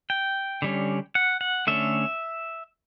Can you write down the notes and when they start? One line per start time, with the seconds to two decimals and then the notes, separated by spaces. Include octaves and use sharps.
0.10 G5
0.62 D3 G3 C#4
1.15 F#5
1.41 F#5
1.67 D3 A3 C#4 E5